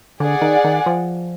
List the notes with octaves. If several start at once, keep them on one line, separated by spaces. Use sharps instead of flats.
D3 G#4 D5 F#5
D#3
D#3
F3